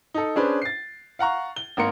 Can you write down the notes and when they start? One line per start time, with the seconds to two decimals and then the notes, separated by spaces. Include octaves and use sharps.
0.14 D#4 A4
0.36 C#4 D4 G#4 B4 C5
0.62 A6 C7
1.19 F5 F#5 A#5 C#6
1.56 G7
1.77 G#1 A#3 A#4 C6 C#7